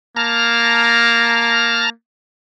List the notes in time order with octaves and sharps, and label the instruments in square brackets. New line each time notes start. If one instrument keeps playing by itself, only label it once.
[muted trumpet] A#3 [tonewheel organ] A5 A#5 F6